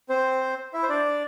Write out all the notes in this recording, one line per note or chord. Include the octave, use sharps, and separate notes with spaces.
C4 C5
E4 E5
C5
D4 D5